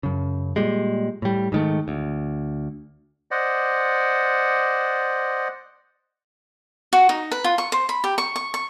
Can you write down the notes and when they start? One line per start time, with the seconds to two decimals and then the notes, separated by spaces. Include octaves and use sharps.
0.03 F#2 C#3
0.56 A#2 G3 G#3
1.22 A2 G3
1.52 G#2 D#3 A3
1.88 D2
3.31 C5 D5 D#5 F#5
6.93 F#4
7.09 D#4
7.31 B4
7.44 F4
7.58 C#6
7.72 C5
7.89 B5
8.04 G4
8.18 C#6
8.36 C#6
8.54 C#6